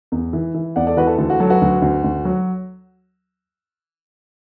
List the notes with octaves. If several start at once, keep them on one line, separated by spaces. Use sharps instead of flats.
E2
E3
E3
E2 D5 F#5
A4 D5
E3 F#4 B4
A4
D2 A4
F#4
F#3 A4
F#4 B4
D2
D2
D2
F#3